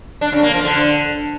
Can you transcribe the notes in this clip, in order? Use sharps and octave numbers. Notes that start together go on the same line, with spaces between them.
D4
C#3
A#3
F3
D3